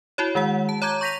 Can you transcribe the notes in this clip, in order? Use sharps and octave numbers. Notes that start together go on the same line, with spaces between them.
E4 F#4 C#5
D#3 G#3 F#5
A5
C#5 A#5 D6 G6 G#6
C#6 G6 A#6 B6 D#7 F7